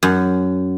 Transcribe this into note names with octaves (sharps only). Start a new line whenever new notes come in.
F#2